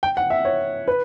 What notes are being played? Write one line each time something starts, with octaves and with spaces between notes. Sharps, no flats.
G5
F#5
E5
C#5
B4